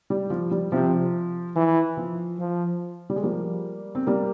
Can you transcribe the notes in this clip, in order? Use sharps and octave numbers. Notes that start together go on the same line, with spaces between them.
G3
F3
G3
C3 F3
E3
F3
F3
G3
G#3
F3 G3 A#3
C4
G3 A#3